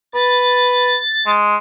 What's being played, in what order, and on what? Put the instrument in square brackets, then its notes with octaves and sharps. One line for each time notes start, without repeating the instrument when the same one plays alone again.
[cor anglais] B4 [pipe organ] A6
[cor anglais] G#3